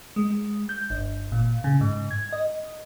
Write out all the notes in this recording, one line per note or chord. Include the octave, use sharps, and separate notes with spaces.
G#3
G6
G1
A#2
C#3
G#2
G#6
D#5